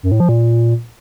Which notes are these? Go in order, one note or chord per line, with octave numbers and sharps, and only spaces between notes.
F#2
A2
F3
A#2